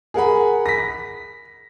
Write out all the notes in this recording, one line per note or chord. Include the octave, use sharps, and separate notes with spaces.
G#4 A#4 F#5 B5
A#6 B6